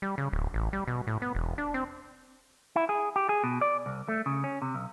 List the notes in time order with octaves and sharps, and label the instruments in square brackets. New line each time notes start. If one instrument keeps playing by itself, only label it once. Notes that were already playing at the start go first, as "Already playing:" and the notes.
[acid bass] G3
C#3
D1
A1
G3
B2
A2
B3
E1
D4
C4
[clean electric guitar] E4
G#4
G4
G#4
B2
D5
C2
A3
C#3
C#4
C3
B1